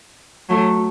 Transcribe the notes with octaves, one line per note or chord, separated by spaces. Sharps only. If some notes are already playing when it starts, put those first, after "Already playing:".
F#3 A3